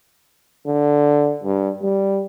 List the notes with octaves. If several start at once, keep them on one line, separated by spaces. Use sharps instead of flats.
D3
G2
G3